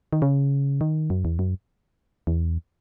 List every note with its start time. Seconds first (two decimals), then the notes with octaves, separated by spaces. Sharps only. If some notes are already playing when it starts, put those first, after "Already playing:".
0.13 D#3
0.22 C#3
0.81 D#3
1.10 F#2
1.25 E2
1.39 F#2
2.27 E2